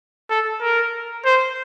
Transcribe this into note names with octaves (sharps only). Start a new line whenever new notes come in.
A4
A#4
C5